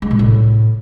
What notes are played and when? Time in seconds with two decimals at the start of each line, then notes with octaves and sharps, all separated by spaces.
0.02 G#3
0.11 A#2
0.19 A2